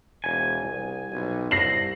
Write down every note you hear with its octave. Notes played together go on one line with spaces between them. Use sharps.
E1 G#5
C2
B1
C2 A#6 C7 F#7